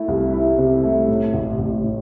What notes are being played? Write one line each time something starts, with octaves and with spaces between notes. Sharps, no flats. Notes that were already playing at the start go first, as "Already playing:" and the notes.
Already playing: A3 E4
C2
E4
C3
A3
A2
A1
A1
A2